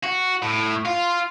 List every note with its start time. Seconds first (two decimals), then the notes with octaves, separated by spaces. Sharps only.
0.04 F#4
0.43 A2
0.85 F4